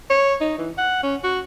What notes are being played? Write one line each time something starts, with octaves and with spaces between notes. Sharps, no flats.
C#5
D#4
E3
F#5
C#4
F#4